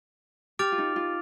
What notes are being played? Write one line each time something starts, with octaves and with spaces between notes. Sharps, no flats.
G4 D6 F6 A6 D7 F7
F4
D#4
F4